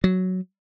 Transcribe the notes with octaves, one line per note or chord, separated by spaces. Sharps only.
F#3